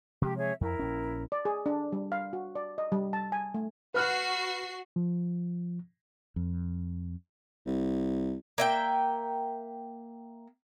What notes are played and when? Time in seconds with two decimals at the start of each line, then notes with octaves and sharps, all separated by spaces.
0.22 C3 F3 G#3 G4
0.36 G#4 C#5 E5
0.61 F2 E4 A#4
0.79 A#1 C#4
1.32 D5
1.45 G#4
1.66 D4
1.92 G3
2.12 F5
2.33 F#4
2.55 D5
2.78 D#5
2.92 G3
3.13 A5
3.32 G#5
3.54 A3
3.94 F#4 B4 F6 F#6 C7
4.96 F3
6.36 F2
7.66 C2
8.58 A#3 E5 G5